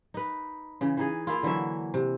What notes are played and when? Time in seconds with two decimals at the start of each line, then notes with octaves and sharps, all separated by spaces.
0.14 D#4 B4
0.81 C#3 E3
0.97 E3 D#4 G#4
1.27 A#3 E4 F4
1.43 D3 E3 F#3 E5
1.94 C3